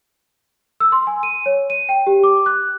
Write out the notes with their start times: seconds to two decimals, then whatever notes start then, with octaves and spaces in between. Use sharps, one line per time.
0.80 E6
0.92 C6
1.07 G#5
1.23 D#7
1.46 C#5
1.70 D#7
1.89 G5
2.07 G4
2.24 D6
2.46 F#6